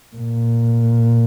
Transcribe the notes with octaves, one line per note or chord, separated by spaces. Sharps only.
A#2